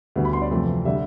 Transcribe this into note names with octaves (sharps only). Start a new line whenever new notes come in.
D2 D3 G3 B3
B5
C6
D5
F2 C3 E3 A3
D3 G3 E5